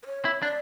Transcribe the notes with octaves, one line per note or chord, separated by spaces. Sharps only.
B4
C#5
E4
D4 D5